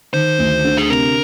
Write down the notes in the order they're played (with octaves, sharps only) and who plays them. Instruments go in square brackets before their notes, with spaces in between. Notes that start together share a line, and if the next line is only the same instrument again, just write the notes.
[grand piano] D#3 [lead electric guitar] C5
[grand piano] D2
D3
[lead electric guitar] G#4
[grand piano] C3 [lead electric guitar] A#4